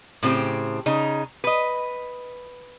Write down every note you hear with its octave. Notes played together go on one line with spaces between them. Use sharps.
A2 C#3 C4 G4
C#3 D#4
B4 D#5